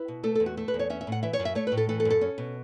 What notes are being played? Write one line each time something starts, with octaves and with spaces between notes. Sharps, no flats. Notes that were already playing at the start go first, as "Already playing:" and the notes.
Already playing: E4 B4
B2
A3 A4
E2 A4
F#4
A3 A4
B4
E2
C#5
C#4 E5
E5
A2 F#5
E3 E5
C#5
F#2
E5
A3 C#5
A2 B4
A4
E3 A4
A4
F#2
A4
C#4
B2